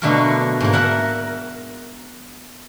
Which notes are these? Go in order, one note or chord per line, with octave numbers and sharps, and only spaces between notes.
B2 D3 F#3 A3 A#3 A#4
G#2 A#3
A#4 E5 F#5 A5